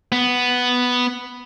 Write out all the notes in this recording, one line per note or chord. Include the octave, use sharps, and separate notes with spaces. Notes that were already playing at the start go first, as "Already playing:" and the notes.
B3